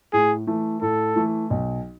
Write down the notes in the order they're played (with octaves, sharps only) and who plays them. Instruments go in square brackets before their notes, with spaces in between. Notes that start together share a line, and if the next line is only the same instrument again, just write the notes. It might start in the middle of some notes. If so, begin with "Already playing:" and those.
[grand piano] A2 [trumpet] G#4
[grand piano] E3 A3
[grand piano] A2 [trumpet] A4
[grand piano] E3 A3
B1